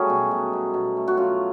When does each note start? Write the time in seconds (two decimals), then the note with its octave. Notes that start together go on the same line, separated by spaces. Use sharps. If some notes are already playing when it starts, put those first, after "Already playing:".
Already playing: F#3 G3 A3 C#4 G#4
0.10 B2
0.31 B2
0.53 B2
0.74 B2
0.97 A3
1.08 F#4
1.17 F#3 F4